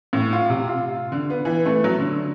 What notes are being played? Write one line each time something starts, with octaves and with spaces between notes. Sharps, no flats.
A2
F4
C3
F4
D3
B3
E3
A3
F#3
D3